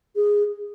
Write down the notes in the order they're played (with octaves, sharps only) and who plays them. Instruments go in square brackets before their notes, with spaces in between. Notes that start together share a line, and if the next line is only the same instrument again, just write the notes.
[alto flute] G#4